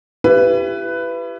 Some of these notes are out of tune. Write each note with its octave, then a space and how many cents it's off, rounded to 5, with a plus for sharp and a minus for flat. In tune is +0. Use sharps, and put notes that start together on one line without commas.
E4 +35 G4 +0 B4 +10